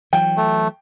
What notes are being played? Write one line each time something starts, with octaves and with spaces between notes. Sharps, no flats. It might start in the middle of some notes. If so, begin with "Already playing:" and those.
E3 F#3 G5
A3